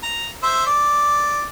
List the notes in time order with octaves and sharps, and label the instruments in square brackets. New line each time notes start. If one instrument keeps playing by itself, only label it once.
[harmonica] A#5
C5 E5
D5